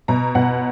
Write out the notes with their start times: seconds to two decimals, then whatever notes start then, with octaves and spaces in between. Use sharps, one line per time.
0.08 B2 A#5
0.35 B2 F#5